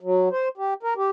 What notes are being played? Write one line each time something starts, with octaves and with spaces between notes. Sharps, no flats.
F#3
C5
G4
A#4
G4